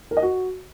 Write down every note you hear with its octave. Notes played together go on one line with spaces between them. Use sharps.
A#4
D#5
F#4